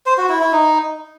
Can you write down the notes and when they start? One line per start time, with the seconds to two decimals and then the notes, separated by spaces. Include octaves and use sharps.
0.06 C5
0.18 F#4
0.29 E4
0.41 E4
0.52 D#4